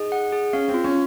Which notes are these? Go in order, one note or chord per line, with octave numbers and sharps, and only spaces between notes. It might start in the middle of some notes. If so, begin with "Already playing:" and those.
Already playing: D#4 G#4
F#5
G#4
C#4 F5
C4
F4
C#4